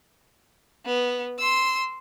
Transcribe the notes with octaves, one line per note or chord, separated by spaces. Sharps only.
B3
C6 E6